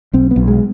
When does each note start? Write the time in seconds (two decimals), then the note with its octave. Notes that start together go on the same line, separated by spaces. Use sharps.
0.13 B1 C4
0.31 B3
0.36 B1
0.48 G#3